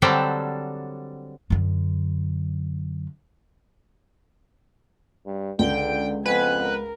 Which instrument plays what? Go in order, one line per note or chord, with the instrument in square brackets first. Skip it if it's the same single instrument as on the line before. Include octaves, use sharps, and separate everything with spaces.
[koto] D3 F#3 G3 C4 D4 A4
[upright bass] F#2 D3
[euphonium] G2
[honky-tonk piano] C#2 [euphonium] D3 [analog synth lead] G5
[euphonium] F2 [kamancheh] B3 G#5 [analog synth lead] B4
[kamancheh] A#4